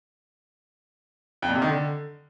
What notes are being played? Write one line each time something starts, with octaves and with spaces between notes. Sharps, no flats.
F2
A#2
C3
D#3
D3